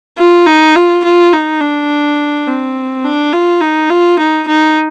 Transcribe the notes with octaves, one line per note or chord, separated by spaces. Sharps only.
F4
D#4
F4
F4
D#4
D4
C4
D4
F4
D#4
F4
D#4
D#4